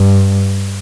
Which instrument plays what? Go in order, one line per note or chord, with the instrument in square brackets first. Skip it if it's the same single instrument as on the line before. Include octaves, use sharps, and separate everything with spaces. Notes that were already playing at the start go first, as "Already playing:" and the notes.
Already playing: [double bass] G2